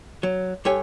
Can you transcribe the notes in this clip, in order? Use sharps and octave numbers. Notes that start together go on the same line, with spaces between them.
F#3
G2 G4 A4 C#5 G5 G#5